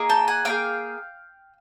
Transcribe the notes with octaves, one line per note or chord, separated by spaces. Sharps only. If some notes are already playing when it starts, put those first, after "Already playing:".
Already playing: A#3 D#4 G#4
G5 A5
F#5 G#5
A#3 D#4 G#4 F5 G5